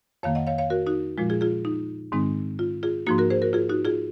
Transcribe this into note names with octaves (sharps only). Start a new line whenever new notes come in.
F2 D#3 A#3 C#5 F5
D#5 F#5
C#5 F5
C#5 F5
F#4 A#4
D#4 F#4
A#2 F3 G#3 F4
F4 G#4
F4 G#4
D#4
G#2 D#3 G#3 C4 D#4
F4
F4 G#4
G#2 F3 A#3 D#4 F#4
F#4 A#4
G#4 C5
F#4 A#4
F4 G#4
D#4 F#4
F4 G#4